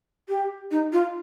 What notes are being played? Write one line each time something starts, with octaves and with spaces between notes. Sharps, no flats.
G4
D#4
F4